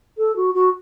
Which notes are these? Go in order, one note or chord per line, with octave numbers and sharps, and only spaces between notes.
A4
F#4
F#4